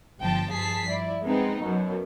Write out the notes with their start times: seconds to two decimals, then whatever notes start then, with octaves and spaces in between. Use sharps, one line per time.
0.19 G1 F3 G5 A5
0.52 G2 F3 G#4 A5 B6 C7
0.89 E4 D5
1.23 G#3 B3 C4 D#4
1.62 F#2 B2 F#3